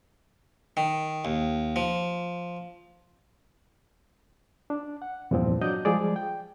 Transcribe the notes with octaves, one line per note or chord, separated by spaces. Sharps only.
D#3
D#2
F3
D4
F#5
E2 G2 A#2 F3 C4
F#3 D4 D5 D#5 G6
F3 G3 G#3 G#4 D5
G5